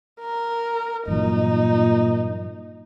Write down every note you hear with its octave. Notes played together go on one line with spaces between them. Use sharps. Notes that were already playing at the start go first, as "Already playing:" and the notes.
A#4
G2 A#2 E3 F#3 D#4